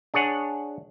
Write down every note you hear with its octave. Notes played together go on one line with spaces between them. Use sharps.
D4 G#4 C#5 F#5